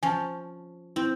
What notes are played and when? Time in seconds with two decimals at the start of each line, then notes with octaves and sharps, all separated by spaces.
0.03 F3 C#4 G#5 A5
0.96 C4 E4